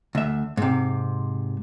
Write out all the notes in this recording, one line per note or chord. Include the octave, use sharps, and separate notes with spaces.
D2 E5
G#2 C3